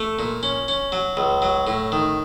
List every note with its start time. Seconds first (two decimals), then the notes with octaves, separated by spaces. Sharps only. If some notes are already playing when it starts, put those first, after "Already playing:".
Already playing: A3
0.19 A#2
0.43 C#4
0.68 C#4
0.92 F#3
1.17 C#2
1.42 F#3
1.67 A2
1.92 D#3